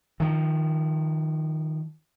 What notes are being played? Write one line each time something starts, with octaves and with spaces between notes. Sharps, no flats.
D#3 F3